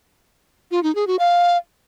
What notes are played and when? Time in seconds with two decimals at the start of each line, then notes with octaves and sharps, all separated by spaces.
0.71 F4
0.83 D#4
0.95 G#4
1.07 F#4
1.19 F5